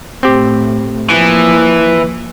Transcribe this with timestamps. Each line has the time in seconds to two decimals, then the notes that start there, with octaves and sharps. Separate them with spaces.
0.23 A2 A3 C4 G4
1.10 E3 F3 A#3